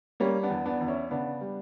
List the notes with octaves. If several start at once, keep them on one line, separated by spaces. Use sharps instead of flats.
G3 A#3 C#4
B3 D4
E2
B3 D4
E2
C#4 E4
C#3 B3 D4
G3